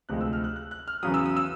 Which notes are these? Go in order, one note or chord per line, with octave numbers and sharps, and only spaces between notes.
D2 C3 F3 G#3 F#6
E6
F6
F#6
F#6
F#6
F6
E2 C#3 F#3 D#6
E6
D#6
E6